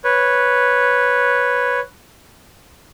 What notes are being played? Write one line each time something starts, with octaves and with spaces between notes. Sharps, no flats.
B4 C#5